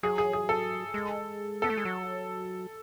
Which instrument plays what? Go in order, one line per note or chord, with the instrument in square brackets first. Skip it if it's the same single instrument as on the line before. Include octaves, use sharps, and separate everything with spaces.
[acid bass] F#3 [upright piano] G#4
[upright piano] G#4
G#4
A4
[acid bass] G#3
[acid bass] B3 [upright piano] A4
[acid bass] A3
G#3
F#3